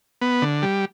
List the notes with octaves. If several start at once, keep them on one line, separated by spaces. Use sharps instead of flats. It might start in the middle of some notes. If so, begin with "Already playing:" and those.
B3
D3
G3